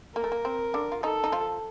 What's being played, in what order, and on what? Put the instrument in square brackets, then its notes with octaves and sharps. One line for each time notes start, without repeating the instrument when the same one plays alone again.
[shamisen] A#3 [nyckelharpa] A#4
[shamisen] A3
A#3
C4
D3 D4
F4
[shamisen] D#3 D#4 [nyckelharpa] A4
[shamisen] D#4
F3 F4